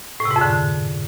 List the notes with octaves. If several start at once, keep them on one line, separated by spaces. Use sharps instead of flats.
A2
C3
G#2
F2
D3